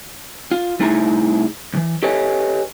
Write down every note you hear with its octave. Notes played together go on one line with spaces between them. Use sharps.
F4
C2 A3 D#4 E4 G#4 A#5
C2 E3
G4 A4 B4 C#5 D#5 G#5